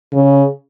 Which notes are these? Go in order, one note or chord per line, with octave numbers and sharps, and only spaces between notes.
C#3